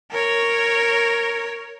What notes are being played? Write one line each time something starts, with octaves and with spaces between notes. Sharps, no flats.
A#4 C#5